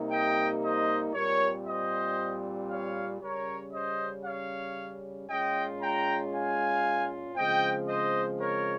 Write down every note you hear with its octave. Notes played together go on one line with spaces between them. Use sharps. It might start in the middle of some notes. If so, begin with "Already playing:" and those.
Already playing: C3 G3 A#3 D#4
D#5 G5
C5 D#5
A#2 G3 C4 A#4 C#5
C5 D#5
C#5 F5
C#3 G3 C#4 A#4 C#5
C5 D#5
C#5 F5
A#2 G#3 C#4 F4 D#5 G5
G5 A#5
F5 G#5
C#3 F3 G#3 C4 D#5 G5
C5 D#5
A#4 C#5